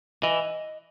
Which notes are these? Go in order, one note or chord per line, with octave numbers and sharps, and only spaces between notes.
E3 D#5